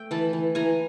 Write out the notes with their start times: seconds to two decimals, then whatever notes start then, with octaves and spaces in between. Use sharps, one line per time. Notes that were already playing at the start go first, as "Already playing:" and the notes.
Already playing: A3 E5 G5
0.11 E3 A5 B5
0.33 E3
0.55 E3 G#5 A#5